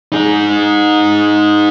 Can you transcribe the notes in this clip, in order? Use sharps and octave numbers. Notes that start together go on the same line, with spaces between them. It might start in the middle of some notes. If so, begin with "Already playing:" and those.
D#4 G#4